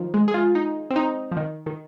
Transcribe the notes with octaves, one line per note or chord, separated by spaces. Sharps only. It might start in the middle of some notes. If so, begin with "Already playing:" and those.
Already playing: D#3 F3
G#3
G#4
F4
D#4
C4
D#4
F3
D#3
D#3